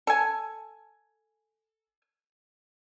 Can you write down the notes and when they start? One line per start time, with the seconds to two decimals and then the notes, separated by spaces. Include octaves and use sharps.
0.07 A4 G#5